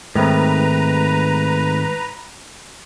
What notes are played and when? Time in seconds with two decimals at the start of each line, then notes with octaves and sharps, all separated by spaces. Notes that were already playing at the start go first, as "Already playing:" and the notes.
0.16 G#2 D#3 A3 C4 B4 A#5